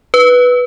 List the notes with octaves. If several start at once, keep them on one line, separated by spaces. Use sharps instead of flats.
B4